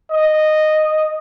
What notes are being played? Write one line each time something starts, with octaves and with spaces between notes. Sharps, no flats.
D#5